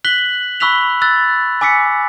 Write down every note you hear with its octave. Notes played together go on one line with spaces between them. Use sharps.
F#6 B6 F#7 G7
B5 C#6 E6 F#6 B6 F7
E6 F#6 A6
G#5 D6 E6 B6 C#7